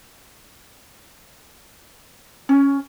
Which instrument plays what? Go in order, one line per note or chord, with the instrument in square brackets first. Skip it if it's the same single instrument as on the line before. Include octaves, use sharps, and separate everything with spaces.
[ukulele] C#4